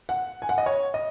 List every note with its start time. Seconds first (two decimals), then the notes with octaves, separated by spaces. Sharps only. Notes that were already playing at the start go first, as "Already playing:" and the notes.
0.09 F#5
0.42 G#5
0.49 F#5
0.58 D#5
0.66 C#5
0.94 D#5